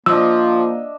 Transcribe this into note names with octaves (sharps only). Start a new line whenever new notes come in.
F3 A#3 D4 D#5 E5 E6